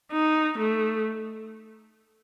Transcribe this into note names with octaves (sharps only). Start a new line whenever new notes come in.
D#4
A3